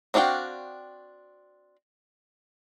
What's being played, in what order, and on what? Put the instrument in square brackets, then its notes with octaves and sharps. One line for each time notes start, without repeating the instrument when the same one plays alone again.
[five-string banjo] C4 D4 F#4 F5 G5